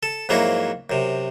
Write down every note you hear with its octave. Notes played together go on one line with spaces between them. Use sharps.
A4
F2 G#2 F#3 A#3 E4
F#2 C3